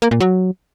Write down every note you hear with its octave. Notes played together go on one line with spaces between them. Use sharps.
A#3
A#2
F#3